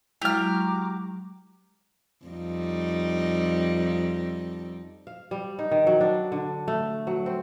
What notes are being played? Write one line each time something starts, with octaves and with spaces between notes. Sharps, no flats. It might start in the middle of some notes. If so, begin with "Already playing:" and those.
F#3 G#3 E4 F#4 G4 A#5 D6 F6
F2 G3 D#4
F5
G3
D#4
D#3
F#3
D4
D3
A3
F#3
C4